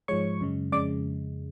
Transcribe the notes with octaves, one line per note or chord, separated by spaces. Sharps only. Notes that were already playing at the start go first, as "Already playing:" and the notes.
G#2 F3 G#3 C#5 C#6
F#2 C#3 G#3
F2 C#3 G#3 D5 D6